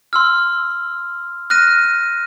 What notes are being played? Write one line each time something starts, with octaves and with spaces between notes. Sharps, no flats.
C6 E6 F6
F6 F#6 A#6 D#7